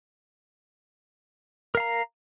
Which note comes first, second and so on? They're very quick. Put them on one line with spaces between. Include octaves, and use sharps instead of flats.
A#4 F5 A#5